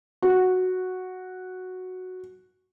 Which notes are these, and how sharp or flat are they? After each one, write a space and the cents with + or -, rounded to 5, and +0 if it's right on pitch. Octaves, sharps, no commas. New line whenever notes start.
F#4 -5